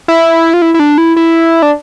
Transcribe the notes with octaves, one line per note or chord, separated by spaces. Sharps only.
E4
F4
E4
E4
D4
E4
E4
D4